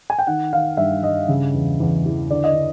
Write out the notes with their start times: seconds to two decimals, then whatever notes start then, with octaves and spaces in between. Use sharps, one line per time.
0.10 G#5
0.19 G5
0.27 D#3 F#5
0.53 D#3 F5
0.77 G2 E5
1.03 G2 D#5
1.28 C#3
1.54 E2
1.80 E2
2.06 E3
2.30 D3 D5
2.44 D#5
2.55 D3